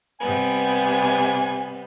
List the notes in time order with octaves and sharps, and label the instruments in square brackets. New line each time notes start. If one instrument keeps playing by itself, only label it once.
[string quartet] C3 G3 B3 [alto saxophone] G#5